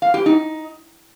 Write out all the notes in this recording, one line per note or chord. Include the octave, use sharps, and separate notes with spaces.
F5
G4
D#4